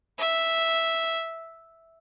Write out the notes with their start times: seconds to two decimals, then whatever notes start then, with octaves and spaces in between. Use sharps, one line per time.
0.19 E5